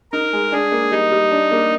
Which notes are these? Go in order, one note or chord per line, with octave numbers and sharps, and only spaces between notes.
D#4 A#4
G#3
D4 G#4
A#3
G3 D#4
G3
D4
A#3